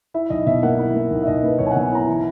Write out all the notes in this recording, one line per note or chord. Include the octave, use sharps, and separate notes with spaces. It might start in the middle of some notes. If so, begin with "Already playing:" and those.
E4 E5
B1 D#5
B2 E5
A#3 F#5
E4
A#3
B1
E5
B1 D#5
A#3 B4
B1 C#5
G#5
B2 F#5
G#5
E4 A#5
E3